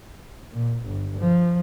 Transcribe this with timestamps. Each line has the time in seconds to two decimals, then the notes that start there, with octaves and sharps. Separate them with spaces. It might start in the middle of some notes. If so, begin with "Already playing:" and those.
0.54 A#2
0.85 G1
1.18 F3